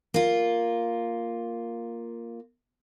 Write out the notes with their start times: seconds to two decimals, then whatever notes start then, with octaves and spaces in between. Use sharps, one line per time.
0.14 A#3 F4